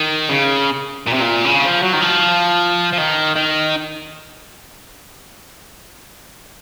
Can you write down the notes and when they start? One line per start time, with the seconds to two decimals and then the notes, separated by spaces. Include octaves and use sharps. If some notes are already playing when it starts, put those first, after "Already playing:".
Already playing: D#3
0.29 C#3
1.07 A#2
1.13 C3
1.20 A#2
1.45 C#3
1.64 F3
1.83 F#3
1.93 D#3
2.02 F3
2.93 F3
2.98 D#3
3.36 D#3